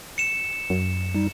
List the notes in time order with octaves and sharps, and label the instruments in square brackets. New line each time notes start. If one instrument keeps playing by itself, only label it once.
[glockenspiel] C#7 E7
[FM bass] F#2
[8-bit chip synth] G3 D#4